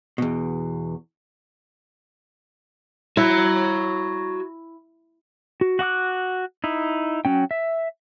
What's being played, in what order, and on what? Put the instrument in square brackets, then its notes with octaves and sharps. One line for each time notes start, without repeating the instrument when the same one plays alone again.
[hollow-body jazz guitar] E2 B2
[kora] E4 [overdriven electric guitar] F#4 A#5
[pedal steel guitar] F#4
F#4 F#5 D6 F#6
D#4 E4
F#3 C#4 G5
E5